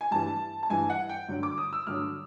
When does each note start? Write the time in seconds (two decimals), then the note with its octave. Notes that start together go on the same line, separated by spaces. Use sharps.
0.01 G#5
0.11 G2 E3 G3 A5
0.63 A5
0.70 G2 E3 G3 G#5
0.90 F#5
1.09 G5
1.29 G2 D3 F#3
1.43 D6
1.58 D#6
1.73 E6
1.87 G2 D3 F#3 F6